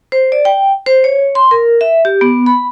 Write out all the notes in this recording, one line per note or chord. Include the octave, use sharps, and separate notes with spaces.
C5
D5
G5
C5
C#5
C6
A#4
E5
G4
B3
B5